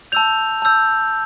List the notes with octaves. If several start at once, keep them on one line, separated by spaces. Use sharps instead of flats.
A5 E6 G6 F7
A5 E6 G6